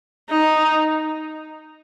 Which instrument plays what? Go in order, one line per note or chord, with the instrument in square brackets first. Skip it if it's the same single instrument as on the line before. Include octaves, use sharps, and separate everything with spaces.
[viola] D#4